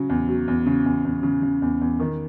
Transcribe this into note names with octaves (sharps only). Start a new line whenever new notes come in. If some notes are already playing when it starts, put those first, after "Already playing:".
Already playing: C#3 F#3
E2
F#3
E2
C#3
E2
E2
C#3
C#3
E2
E2
D#3